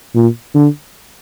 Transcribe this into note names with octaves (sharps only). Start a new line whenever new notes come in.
A#2
D3